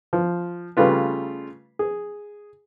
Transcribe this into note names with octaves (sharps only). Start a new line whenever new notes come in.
F3
C#3 G3 A3 F4 B4
G#4